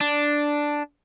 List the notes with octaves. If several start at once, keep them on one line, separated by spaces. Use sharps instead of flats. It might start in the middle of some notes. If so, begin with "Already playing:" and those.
D4